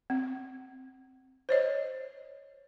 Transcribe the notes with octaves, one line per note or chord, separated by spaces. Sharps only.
C4
C5 C#5 D#5